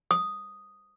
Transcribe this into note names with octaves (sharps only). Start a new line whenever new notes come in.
D#6